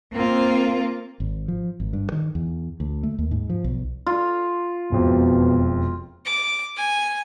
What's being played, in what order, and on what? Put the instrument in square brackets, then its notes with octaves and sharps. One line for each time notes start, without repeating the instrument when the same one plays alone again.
[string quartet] A#3 F4 [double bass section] C4
[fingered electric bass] G#1
F3
G#1
G2
D#3
E2
D2
A3
D#2
G#2
F3
B1
[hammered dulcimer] F4
[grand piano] E1 F2 [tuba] B2
[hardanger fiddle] D6
G#5